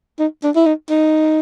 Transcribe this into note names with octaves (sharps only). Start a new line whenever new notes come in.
D#4
D4
E4
D#4
D#4